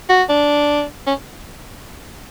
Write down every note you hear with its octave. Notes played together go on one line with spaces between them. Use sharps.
F#4
D4
C#4